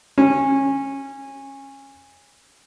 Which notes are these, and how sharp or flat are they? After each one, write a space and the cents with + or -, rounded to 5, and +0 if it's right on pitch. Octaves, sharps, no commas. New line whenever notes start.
C#4 -20